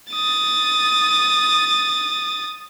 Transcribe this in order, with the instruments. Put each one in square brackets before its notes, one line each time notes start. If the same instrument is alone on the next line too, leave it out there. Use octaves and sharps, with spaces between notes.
[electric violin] D#6 A6